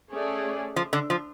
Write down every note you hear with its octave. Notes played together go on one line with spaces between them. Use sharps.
A3 C#4 G#4 D5
F3
D3
F3